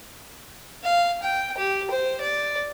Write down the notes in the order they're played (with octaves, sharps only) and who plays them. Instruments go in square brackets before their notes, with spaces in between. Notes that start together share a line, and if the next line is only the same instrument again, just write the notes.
[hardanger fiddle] F5
G5
G4
C5
D5